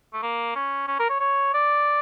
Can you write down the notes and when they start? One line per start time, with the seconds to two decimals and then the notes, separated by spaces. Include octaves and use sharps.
0.13 A3
0.23 A#3
0.55 C#4
0.87 C#4
1.00 A#4
1.10 C#5
1.20 C#5
1.54 D5